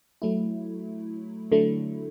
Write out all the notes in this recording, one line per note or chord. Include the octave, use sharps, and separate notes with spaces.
F#3 A3 E4
D3 F#3 A3 E4